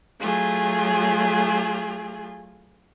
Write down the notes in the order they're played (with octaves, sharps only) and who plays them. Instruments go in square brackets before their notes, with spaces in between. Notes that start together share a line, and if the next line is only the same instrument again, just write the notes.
[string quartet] F#3 A3 F4 G#4